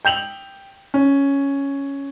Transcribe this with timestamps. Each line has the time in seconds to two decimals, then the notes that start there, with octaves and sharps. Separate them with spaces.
0.05 G5 G6 F7 F#7
0.94 C#4